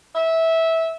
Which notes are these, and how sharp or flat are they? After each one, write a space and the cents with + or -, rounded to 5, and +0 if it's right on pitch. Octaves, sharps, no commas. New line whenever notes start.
E5 -15